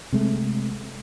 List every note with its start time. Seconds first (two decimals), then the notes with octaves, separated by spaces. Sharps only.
0.13 C3 G#3 A3